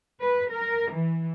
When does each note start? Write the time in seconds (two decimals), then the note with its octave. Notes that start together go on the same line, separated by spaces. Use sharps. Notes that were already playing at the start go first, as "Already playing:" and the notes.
0.22 B4
0.52 A#4
0.92 E3